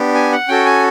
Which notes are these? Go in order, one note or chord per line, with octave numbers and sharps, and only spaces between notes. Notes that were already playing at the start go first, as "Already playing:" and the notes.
Already playing: B3 D4 G4
G#5
F#5
C#4 F#4 A4 G5
G#5